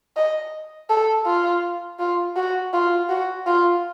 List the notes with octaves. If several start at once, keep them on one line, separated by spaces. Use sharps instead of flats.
D#5
A4
F4
F4
F#4
F4
F#4
F4